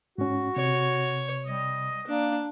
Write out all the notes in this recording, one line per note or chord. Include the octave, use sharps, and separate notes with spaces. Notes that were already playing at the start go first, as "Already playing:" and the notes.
G#2 C#4 F#4
C3 C#5
G3 D#5
A#3 D4